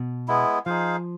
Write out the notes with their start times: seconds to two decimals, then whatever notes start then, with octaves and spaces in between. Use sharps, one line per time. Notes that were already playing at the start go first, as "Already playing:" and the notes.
Already playing: B2
0.28 G#3 B3 E4
0.66 F3 D#4 G#4 C5 F5